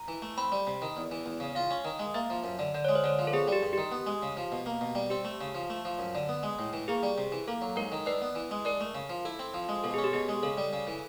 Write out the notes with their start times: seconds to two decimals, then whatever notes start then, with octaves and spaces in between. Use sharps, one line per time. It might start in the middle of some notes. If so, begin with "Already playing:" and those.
Already playing: A#5
0.08 E3
0.22 A3
0.37 C4 B5
0.52 G3
0.67 C3
0.82 D#3
0.97 E2
1.11 E3
1.26 E2
1.40 C#3
1.55 F4 F5
1.71 C#4
1.85 D#3
1.99 G#3
2.14 A#3 E5
2.30 F3
2.44 F#2
2.59 D3
2.74 D3 D5
2.85 G#3 C#5
2.95 C5
3.04 D3 C#5
3.19 F3
3.27 A4
3.33 B3 G#4
3.48 G3 G4
3.63 G2
3.73 D#3 G4
3.92 B3
4.06 G#3
4.22 C#3
4.37 F3
4.52 B2
4.66 A#3
4.81 B2
4.95 G3
5.10 C4 G4
5.25 A3
5.41 C#3
5.55 F3
5.70 A3
5.85 F3
5.99 F#2
6.15 D3
6.29 B3
6.43 G#3
6.59 A2
6.73 E3
6.88 A#3 G#4
7.03 G3
7.18 C3
7.32 E3
7.48 A#3 A4
7.62 F#3
7.76 G#2 A#4
7.92 D#3
8.06 D4 B4
8.22 B3
8.35 E3
8.51 G#3
8.65 D4 A#4
8.81 A3
8.95 C#3
9.09 F3
9.25 E4 A4
9.39 C4
9.54 F3
9.69 G#3
9.84 B2 A4
9.94 C#4 G#4
10.04 G4
10.13 B2 G#4
10.29 G#3
10.43 C#3 A4
10.57 G3
10.73 C#3
10.87 E3